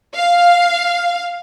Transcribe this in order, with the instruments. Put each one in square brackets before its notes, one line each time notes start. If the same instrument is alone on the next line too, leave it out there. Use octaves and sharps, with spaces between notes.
[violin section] F5